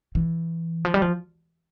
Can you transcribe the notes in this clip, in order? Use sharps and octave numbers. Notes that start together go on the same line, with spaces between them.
E3
F3
G3
F3